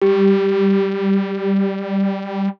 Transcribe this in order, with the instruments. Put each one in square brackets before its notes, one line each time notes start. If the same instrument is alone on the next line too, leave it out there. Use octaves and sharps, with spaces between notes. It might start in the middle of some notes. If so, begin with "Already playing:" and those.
[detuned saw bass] G3 [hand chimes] G4